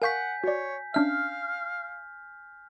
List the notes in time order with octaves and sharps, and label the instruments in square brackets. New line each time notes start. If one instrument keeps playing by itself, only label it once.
[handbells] A#4 F5 C#6 [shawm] F#5 [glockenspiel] G#5 G6 B6
[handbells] F#4 D5 [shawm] C#5
[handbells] C#4 D4 E5 [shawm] F5 [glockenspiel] F6